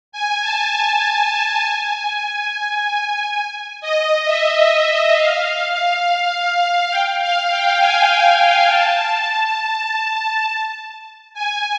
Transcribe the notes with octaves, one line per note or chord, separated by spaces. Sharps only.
G#5
A5
G#5
G#5
A5
G#5
D#5
E5
D#5
E5
F5
G5
F5
G5
G#5
G5
G5
A5
G#5